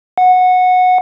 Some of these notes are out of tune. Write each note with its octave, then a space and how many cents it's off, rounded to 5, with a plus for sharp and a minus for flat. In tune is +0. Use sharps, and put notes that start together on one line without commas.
F#5 -15